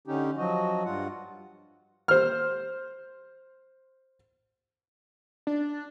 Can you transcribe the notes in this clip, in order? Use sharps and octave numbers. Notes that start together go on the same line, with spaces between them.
D3 C#4 D#4 G4
F3 F#3 F#4 D#5
G2 G3 F4 F#5
C5 F6
D4